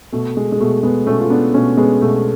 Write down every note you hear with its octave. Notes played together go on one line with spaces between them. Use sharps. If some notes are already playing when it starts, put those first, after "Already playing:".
B2 A3
G#3
G#3
B2 A3
G#3 B3
B2 A3 C#4
F4
B3 D4
B2 A3 C#4
G#3 B3
B2 A3